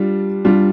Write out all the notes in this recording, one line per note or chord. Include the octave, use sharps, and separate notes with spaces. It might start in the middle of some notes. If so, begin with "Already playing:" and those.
Already playing: G3 D4 F4
G3 D4 F4